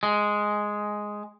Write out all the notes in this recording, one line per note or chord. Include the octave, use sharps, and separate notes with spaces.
G#3